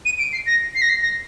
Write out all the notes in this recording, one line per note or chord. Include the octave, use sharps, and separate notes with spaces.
D#7
D7
C7
A#6
C7
A#6
C7
A#6